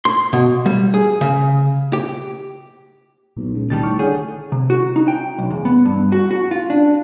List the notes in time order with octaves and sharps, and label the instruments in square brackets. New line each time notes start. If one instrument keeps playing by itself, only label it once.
[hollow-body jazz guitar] C6
B2
G3
G#4
C#3
G4
[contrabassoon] B1 [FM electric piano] A#2
[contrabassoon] C#2
[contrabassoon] F1 [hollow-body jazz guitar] D#2 D#3 G3 [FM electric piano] A5 A6
[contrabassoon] A2 [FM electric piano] C#6 D6 F6
[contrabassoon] D3 [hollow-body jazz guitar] G#4 [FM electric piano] C#5 F#5 G6
[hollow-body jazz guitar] C3
F#4
D#4
G5
B1
E2
B3
G2
F#4
F#4
F4
D4